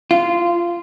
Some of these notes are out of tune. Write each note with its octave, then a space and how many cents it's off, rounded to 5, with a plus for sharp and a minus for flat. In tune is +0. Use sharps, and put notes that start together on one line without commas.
F4 -15